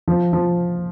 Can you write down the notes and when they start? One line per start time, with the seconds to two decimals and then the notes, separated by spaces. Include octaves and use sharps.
0.08 F3
0.33 F3